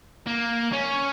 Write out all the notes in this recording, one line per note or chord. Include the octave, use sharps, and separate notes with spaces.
A#3
C#4